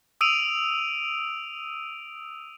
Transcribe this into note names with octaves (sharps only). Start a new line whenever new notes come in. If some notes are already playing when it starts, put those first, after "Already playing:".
D#6 E6 D7 D#7 F7